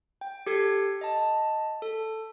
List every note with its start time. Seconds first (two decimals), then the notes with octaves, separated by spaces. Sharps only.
0.21 G5
0.46 G4 A4 G#6 C7
1.01 D#5 A5
1.82 A4